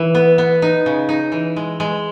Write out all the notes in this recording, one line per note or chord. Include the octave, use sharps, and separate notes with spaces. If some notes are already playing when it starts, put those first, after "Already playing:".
Already playing: E3
B3
B3
D#4
C#3
D#4
E3
G#3
G#3